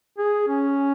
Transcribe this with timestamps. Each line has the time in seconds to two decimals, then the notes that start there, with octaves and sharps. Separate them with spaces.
0.18 G#4
0.48 C#4